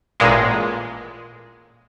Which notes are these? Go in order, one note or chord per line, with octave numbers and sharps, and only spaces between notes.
A1 A#2 G#3